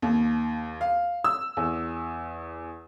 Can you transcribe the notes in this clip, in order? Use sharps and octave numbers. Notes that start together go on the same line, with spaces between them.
D#2
F5
E6
E2